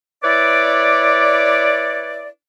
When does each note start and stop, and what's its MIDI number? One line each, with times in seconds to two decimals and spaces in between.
0.23 2.27 64
0.23 2.27 71
0.23 2.27 73
0.23 2.27 74